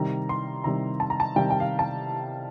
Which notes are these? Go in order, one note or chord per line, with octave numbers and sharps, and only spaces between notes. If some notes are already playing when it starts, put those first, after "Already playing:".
Already playing: C3 D#3 G3 A#5
C6
C3 D#3 G3 A#5
A5
A#5
A5
C3 D#3 G3 G5
G5
F5
A5